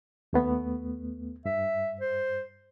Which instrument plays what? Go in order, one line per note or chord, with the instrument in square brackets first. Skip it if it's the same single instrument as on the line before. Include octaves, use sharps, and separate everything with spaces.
[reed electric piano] D#2 A3 B3
[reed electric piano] G2 [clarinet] E5
[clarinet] C5